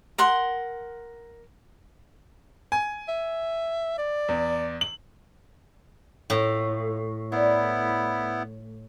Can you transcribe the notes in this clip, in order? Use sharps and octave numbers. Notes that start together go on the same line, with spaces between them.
A#4 F#5 C6
G#5
E5
D5
E2
F#7
A2 A#3 F4
B3 D4 E4 A#4